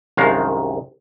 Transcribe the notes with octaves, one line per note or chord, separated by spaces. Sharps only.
C2 F#2 D#3 G#3 F5